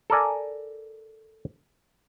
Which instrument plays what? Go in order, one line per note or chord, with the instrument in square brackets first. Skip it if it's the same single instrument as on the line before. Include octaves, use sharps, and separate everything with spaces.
[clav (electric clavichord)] A4 A#4 D5 G#5